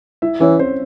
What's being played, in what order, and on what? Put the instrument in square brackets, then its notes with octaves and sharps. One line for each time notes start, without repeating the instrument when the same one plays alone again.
[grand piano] E4 E5
[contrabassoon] E3 [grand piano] C#4 C#5
[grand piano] C4 C5